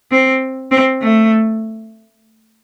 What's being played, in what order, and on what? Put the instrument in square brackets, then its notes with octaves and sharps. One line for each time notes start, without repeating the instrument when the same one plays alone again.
[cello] C4
C4
A3